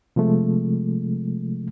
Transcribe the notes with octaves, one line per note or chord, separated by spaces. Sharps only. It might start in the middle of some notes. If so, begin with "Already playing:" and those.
C3 F3 G#3 A3